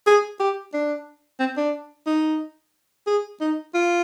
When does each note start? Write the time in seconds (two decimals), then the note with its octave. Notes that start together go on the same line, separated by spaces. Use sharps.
0.07 G#4
0.40 G4
0.73 D4
1.39 C4
1.57 D4
2.07 D#4
3.07 G#4
3.41 D#4
3.74 F4